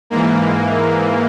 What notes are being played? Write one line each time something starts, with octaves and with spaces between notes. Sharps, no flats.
G#2 E3 A#3